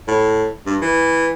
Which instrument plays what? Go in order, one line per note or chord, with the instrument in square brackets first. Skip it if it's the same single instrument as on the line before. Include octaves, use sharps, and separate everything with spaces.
[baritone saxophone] A2
G2
E3